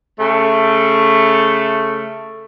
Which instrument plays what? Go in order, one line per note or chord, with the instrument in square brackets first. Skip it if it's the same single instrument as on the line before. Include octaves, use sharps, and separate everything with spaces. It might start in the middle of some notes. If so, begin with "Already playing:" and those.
[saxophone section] C#3 A3